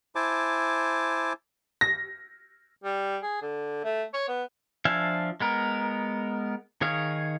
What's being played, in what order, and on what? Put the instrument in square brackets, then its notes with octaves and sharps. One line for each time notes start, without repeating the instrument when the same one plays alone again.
[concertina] E4 C5 G#5 A5 D6
[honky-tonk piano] A#6
[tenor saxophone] G3
G#4
D3
A3
C#5
B3
[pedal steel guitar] F3 D4 E5 F5 G#5
G#3 B3 A#4
D#3 G#4 C#5 F5